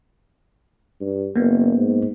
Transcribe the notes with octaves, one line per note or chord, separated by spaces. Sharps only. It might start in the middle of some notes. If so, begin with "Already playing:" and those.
G2
F#1 A#3 B3
G#2